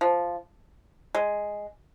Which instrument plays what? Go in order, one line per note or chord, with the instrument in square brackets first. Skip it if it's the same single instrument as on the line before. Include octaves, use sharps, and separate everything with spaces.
[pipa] F3
G#3